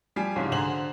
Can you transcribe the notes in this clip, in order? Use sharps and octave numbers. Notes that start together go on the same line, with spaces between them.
F3 G3 G4 G#5 C7
C2 G#2 C#3 F3
D3 F#4 G#4 C5 A#5 F#7